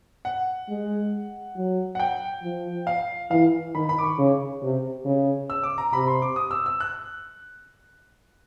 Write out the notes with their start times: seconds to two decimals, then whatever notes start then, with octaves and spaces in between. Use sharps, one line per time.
0.25 F#5
0.69 G#3
1.56 F#3
1.95 F#5
2.00 G5
2.43 F3
2.87 F5
3.31 E3 F5
3.75 D#3 B5
3.89 B5
3.99 D6
4.04 C#6
4.18 C#3
4.63 C3
5.05 C#3
5.50 E6
5.63 D6
5.78 A#5
5.93 C3 B5
6.08 C6
6.22 D6
6.36 D#6
6.51 E6
6.66 E6
6.80 F#6